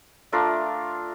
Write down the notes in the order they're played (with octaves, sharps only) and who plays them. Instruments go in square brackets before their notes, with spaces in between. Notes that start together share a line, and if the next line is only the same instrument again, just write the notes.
[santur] A3 D4 F4 A#4